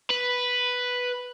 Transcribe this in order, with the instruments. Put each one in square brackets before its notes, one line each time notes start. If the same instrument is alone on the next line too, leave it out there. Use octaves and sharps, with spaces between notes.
[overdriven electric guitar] B4